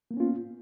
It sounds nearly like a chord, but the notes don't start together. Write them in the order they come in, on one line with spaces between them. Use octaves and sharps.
A#3 B3 C#4 F4